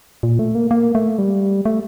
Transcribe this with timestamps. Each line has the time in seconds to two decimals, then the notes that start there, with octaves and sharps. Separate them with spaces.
0.23 A#2
0.39 A3
0.55 A#3
0.71 A#3
0.95 A3
1.18 G3
1.65 A3